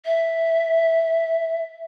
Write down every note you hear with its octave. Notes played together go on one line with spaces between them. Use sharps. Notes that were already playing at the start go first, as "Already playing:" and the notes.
E5